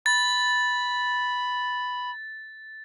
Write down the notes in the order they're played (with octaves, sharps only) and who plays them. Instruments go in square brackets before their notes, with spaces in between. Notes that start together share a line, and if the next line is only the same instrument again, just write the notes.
[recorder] B5 [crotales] A6